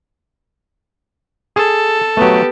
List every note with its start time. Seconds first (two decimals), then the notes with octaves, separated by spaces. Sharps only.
1.56 G#4 A4
2.17 F#3 A3 B3 G4